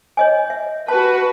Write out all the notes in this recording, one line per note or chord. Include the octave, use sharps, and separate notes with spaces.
C#5 D#5 G#5
E5
F#4 B4 A5